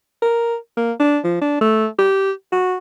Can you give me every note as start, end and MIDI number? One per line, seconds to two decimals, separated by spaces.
0.22 0.56 70
0.77 0.92 58
1.00 1.18 62
1.24 1.41 53
1.41 1.61 62
1.61 1.86 57
1.99 2.31 67
2.52 2.76 66